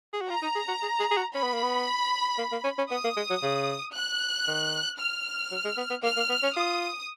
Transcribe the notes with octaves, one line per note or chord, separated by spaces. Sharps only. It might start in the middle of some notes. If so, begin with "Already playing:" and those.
G#4
F#4
F4 A#5
D#4
G#4
F#4
G#4
G#4
G#4
F#4
C#4 B5
B3
A#3
B3
A#3
A#3
C#4
C#4
B3 D#6
A#3
G#3
F#3
C#3
F#6
D#3
F6
F#3
G#3
B3
B3
A#3 F6
A#3
B3
C#4
F4 D#6